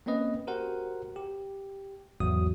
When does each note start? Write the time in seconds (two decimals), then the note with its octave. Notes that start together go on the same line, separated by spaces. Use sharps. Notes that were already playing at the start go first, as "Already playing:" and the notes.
0.06 A#3 C4 C#4 B4 D#5
0.47 F#4 G4 A#4 C5 F#5
1.16 G4
2.20 G#1 E2 G#2 F#3 F#4 D#6